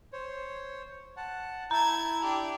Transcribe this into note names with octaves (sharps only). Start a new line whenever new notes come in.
C5 C#5
F#5 A5
E4 A5 A#5 G#6
D4 G4